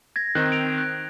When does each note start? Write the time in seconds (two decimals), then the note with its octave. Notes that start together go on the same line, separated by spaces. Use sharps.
0.16 G#6 A#6
0.35 D#3 C4 D#4 F#6
0.52 D7 F7
0.78 F#6